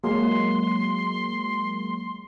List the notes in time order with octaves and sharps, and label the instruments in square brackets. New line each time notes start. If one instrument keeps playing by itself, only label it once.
[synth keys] F#3 G#3 A#3 [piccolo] C6